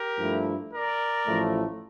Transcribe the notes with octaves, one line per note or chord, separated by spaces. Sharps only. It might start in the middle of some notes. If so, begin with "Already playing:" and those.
Already playing: G4 A#4
G2 F3 A3 E4
A#4 D5
A1 A2 F3 A3